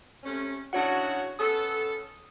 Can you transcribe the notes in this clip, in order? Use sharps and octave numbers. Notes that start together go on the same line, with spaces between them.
C3 A3 C#4
C#3 D4 E4 F#4 C#5 F#5
B3 C#4 A4 D#6